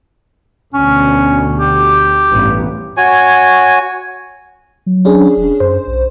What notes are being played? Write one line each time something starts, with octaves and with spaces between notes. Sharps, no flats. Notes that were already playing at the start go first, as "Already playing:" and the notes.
D2 B2 C#4
G4
A1 G2 B3
F#4 C#5 G#5
F#3
C#4 D4 G#4
E1
F#2 C5
B1